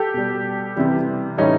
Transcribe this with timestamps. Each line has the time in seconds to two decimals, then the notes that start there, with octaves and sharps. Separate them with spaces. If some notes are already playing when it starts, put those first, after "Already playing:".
Already playing: G4 A4
0.14 B2 G3
0.76 C3 E3 G3
1.38 A2 E3 G3 C#4 D#4